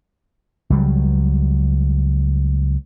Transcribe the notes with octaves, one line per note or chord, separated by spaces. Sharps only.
C#2 F#3 G3